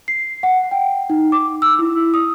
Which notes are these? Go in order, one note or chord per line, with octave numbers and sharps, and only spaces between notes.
C7
F#5
G5
D#4
D6
E6
E4
D#6